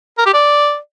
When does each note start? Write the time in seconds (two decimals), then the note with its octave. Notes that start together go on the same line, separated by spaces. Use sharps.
0.18 A#4
0.26 G4
0.34 D5